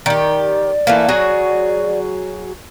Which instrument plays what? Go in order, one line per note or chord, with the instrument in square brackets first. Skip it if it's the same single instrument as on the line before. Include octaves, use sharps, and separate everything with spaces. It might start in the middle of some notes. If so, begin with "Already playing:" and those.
[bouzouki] D#3 G4 [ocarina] D5
[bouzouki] E3 A3 A#3
F#3 F#4 G#4